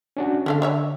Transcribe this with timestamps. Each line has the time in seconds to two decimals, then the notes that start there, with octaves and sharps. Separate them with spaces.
0.17 C#4 D4 F#4
0.46 D3 C#4 A4 F5
0.62 D4 C#5 E5